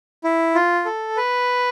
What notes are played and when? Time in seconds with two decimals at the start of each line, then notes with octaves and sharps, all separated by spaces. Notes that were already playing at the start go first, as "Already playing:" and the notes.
0.24 E4
0.55 F4
0.85 A4
1.17 B4